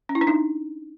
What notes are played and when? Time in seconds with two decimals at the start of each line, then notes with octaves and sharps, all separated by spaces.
0.09 C#4
0.15 E4
0.21 D4
0.27 D#4